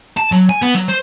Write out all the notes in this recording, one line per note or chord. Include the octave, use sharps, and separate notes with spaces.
A5
F#3
G#5
B3
F#3
C5